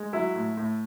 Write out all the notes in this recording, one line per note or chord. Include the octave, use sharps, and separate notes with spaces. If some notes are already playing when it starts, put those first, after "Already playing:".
Already playing: G#3
F#3 E4
A2
A2